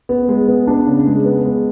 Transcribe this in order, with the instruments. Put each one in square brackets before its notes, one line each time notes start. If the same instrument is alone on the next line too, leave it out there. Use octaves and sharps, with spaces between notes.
[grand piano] B3
G#3
B3
D4
C#3
G#3
B3
G#3